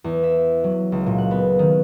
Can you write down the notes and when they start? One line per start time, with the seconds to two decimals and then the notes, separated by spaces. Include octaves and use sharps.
0.04 E2
0.23 E5
0.64 F#3
0.92 C#2
1.06 A#2
1.18 F#5
1.31 B3
1.59 D#3